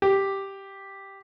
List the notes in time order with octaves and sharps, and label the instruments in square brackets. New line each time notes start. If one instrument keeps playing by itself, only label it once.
[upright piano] G4